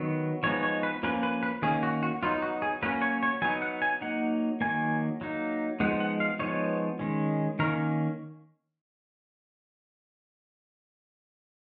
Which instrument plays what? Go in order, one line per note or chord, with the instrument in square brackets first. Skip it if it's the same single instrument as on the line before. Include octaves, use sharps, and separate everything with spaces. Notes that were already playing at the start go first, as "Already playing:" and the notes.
Already playing: [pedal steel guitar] D#3 F#3 B3
F3 G#3 B3 D#4 C#5
C#5
B4
F3 A#3 C#4 B4
B4
B4
D#3 A#3 C#4 G#4
F#4
F#4
F#3 B3 D#4 F4
F#4
G#4
F#3 A#3 C#4 B4
C#5
C#5
F#3 B3 D#4 G#5
F#5
G#5
F#3 A#3 D#4 F#5
D#3 F#3 A#3 G#5
F#3 A#3 D#4
F3 G#3 B3 D#4 F#5
F#5
F5
F3 G#3 B3 D#4 C#5
D#3 G#3 C#4
D#3 A#3 C#4 A#4